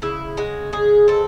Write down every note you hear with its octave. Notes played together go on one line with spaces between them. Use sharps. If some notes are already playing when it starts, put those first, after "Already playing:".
C#3 E4
G#3 F#4
C#3 G#4
C4 A4